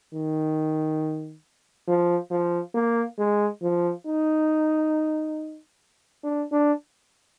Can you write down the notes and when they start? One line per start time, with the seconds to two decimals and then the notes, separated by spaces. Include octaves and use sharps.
0.14 D#3
1.88 F3
2.31 F3
2.74 A#3
3.19 G#3
3.62 F3
4.06 D#4
6.24 D4
6.52 D4